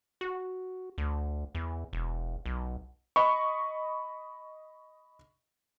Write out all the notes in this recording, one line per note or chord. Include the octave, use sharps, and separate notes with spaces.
F#4
D2
E2
E1
B1
D#5 B5 C#6